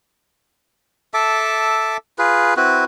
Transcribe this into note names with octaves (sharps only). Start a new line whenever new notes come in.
A4 E5 A5 D6
F4 G#4 B4
C4 E4 F#4 B4